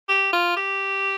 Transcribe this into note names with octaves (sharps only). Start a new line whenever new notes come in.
G4
F4
G4